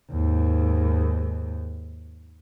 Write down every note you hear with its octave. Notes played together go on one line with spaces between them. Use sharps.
D#2 G#2